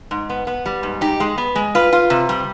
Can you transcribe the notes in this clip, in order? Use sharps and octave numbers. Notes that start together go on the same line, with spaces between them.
G#2
B3
B3
G3
G#2
D#4 G4
G#3
B3
G#3
F4 B4
F4
C3
G3